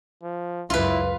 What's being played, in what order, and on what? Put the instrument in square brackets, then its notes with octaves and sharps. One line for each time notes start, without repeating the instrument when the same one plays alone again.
[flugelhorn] F3
[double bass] C#2 F#2 [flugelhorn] E4 [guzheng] F4 B4